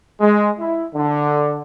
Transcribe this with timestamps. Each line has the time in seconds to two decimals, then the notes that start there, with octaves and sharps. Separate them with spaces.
0.20 G#3
0.59 E4
0.94 D3